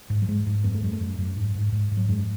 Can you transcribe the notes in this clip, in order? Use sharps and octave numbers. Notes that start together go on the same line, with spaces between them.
G#2
F#3
G#2 G#3
G#2
F#2 B3
A3
F#2 G#3
A3
F#2
F#2
G#2
G#2
G#2
G#2
F#3
F#2 G#3